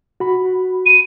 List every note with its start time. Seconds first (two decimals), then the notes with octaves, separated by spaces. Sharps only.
0.20 F#4 B5
0.86 D#7